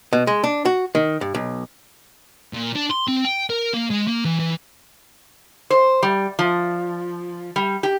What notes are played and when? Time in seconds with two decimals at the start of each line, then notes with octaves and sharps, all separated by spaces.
0.13 B2
0.27 G#3
0.44 D4
0.65 F#4
0.95 D#3
1.21 G2
1.35 B1
2.54 A#2
2.76 D4
2.91 C6
3.08 C4
3.25 G5
3.50 A#4
3.73 A#3
3.90 G#3
4.07 A#3
4.25 E3
4.39 E3
5.70 C5
6.03 G3
6.39 F3
7.56 G3
7.83 G4